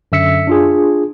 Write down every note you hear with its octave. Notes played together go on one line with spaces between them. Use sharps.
F#2 D3 E5 E6 B6 C#7
D4 F4 G#4